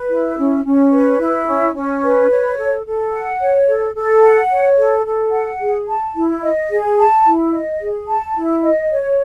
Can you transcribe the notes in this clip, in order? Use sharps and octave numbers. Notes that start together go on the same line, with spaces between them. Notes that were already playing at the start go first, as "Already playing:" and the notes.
Already playing: B4
E4
C#4
C#4
B4
E4
C#4
C#4
B4
C#5
A4
A4
F#5
C#5
A4
A4
F#5
C#5
A4
A4
F#5
G#4
A5
E4
D#5
G#4
A5
E4
D#5
G#4
A5
E4
D#5
C#5